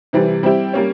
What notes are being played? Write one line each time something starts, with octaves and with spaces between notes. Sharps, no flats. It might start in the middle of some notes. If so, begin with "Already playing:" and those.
C3 E3 G3 C4
G3 C4 E4 G4
G3 A#3 C#4